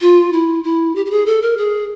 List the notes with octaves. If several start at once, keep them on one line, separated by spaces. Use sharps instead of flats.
F4
E4
E4
G4
G4
G#4
A4
A#4
G#4